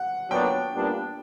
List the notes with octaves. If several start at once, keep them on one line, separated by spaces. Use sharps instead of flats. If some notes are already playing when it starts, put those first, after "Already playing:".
Already playing: F#5
A#2 F#3 B3 D4 G5
A#2 G3 B3 D4